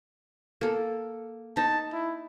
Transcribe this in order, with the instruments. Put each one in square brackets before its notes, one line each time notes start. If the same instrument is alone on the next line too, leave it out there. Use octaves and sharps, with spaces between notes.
[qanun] A#3 A4
[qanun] D#4 [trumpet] A5
[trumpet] E4